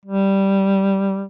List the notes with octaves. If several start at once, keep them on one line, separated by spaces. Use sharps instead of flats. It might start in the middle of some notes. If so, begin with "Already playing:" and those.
G3